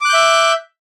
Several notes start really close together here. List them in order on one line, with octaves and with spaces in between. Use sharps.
D6 F#6 G6 E5